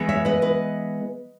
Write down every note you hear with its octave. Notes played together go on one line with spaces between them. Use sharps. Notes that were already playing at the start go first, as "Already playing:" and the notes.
Already playing: E3 G#3 B3
C#5 E5
B4 D#5
B4 D#5